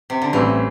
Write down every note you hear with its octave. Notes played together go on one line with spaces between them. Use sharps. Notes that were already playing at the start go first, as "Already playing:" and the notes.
C3
D3
A1 A2 E3 G3 C4